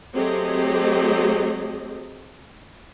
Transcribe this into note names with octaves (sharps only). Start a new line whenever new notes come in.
F#3 A3 C4 G4 G#4 D#5